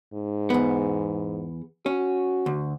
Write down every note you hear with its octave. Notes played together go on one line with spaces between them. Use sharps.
G#2
E2 B3
C#4 F#4
D2